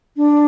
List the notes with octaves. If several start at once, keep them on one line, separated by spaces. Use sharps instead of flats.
D4